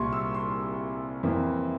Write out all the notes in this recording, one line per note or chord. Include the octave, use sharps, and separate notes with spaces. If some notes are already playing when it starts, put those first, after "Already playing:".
Already playing: C2 A#2 G3 A#3 C6 C#6
E6
C6
F2 E3 A#3